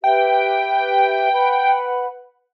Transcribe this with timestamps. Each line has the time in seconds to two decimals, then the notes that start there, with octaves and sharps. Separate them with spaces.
0.04 G4 B4 E5 G5
1.32 B4 F#5 B5